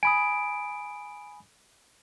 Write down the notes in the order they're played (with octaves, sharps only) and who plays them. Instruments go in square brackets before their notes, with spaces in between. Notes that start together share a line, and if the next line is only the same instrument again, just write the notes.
[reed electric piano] G#5 B5 D#6 [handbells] D7